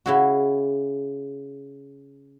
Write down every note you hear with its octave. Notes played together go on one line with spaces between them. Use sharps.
C#3 E4 F#4